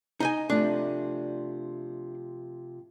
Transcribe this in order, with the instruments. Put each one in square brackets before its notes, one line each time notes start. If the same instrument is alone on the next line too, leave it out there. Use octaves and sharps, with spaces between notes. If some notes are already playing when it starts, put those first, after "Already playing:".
[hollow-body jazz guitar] D#4 D#5 G#5
[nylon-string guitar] C3 F3 A3 [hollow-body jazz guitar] D4